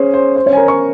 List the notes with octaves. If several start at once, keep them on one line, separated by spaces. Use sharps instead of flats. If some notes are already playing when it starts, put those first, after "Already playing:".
Already playing: C#4 G#4 C5 C#5
C5
C5
C#4 C#5
G#5
A#4 A#5
C#5 C#6